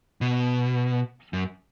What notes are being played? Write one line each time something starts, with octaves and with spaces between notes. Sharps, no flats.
B2
F#2